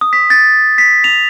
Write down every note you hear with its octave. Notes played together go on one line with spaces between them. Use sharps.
D#6
B6
A6
B6
F7